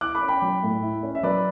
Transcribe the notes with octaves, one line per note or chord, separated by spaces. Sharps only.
E4 D6 F#6
B5 D6
C#4
G5 B5
F#3
A2
E4
C#4
E5
F#3 B4 D5